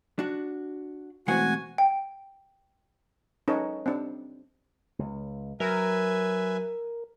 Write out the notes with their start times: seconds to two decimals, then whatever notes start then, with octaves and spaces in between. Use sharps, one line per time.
0.19 D4 F#4
1.28 B1 E3 G#3 A3 C4 F#4 F#5 G#5
1.78 G5
3.48 C#4 D#4 A4 B4 C#5
3.86 C4 D4
4.99 C#2
5.60 F#3 A#4 B4 E5 G#5